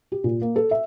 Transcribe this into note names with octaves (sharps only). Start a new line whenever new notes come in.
G4
A#2
A#3
A4
E5